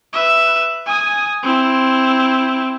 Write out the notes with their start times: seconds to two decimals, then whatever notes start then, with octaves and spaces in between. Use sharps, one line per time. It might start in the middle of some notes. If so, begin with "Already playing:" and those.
0.13 B4 E5
0.86 G#5 D#6
1.43 C4 E4